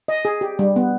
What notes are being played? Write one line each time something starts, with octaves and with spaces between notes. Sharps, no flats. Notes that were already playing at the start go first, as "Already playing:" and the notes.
D#5
G#4
G4
G3
B3